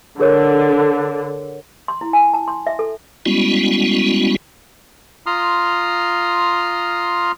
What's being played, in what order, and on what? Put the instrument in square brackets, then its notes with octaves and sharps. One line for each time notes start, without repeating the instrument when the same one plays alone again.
[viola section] D3 [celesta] G#4 A#4 C#5
[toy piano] C6
E4
G#5
A5
C6
E5
A4
[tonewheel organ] G3 G#3 B3 C#4 E4 F#4
[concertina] F4 A#5 C6 D#6 F6